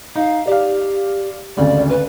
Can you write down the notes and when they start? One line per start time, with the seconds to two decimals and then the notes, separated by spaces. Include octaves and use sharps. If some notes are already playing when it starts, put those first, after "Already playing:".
0.16 D#4 F5
0.47 G4 D5 F5
1.57 G#1 D2 C#3 D5
1.89 B4